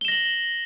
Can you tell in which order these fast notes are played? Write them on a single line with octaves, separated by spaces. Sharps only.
G7 E7 A#6 F#7